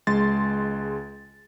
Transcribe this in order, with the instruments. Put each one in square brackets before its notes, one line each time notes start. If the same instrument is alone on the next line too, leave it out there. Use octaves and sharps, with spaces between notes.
[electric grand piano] C#2 G#3 C6 A6